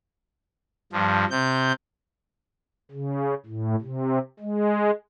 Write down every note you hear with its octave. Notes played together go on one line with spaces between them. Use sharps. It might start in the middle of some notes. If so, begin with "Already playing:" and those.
G2 F3
C3 G6
C#3
A2
C3
G#3